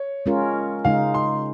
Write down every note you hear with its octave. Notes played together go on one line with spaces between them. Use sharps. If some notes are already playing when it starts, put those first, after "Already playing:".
Already playing: C#5
G#3 C#4 F4 A#4
C#3 G#3 D#4 F5
C6